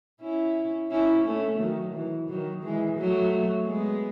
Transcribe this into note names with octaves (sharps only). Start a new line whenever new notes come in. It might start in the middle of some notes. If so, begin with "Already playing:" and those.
C#4 E4
C#4 E4
A3 C#4
D#3 F#3
E3
D#3 F#3
E3 G#3
F#3 A3
G#3 B3